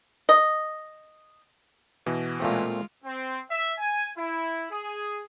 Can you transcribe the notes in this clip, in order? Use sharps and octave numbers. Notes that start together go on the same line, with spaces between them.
D#5
B2 E3
A#2 G#3 A3 C4 F4
C4
E5
G#5
E4
G#4